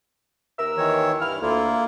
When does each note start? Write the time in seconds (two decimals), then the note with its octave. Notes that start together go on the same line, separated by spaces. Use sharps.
0.59 D#2 A#4 E6
0.78 D#3 E3 C#5
1.21 G2 E3 E4 F6
1.42 D2 A#3 E4 F4